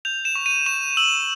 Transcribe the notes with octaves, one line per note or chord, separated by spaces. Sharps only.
G6 F7
E7
C#6
D#7
C#6 E7
E6 F#7